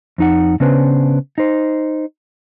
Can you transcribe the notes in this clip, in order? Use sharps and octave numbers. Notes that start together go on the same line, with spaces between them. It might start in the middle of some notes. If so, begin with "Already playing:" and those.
F2 D#4 F#5
C#3 B3 C#4 D4 B4 C5
D#4 C5